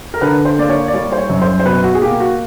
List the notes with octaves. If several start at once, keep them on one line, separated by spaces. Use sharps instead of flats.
A#4
D3 B4
C5
A#3 D5
C#5
D5
G3 C#5
C5
C#5
F#2
C5
C5
B2 B4
F#4
G#4
A#3 G4
F#4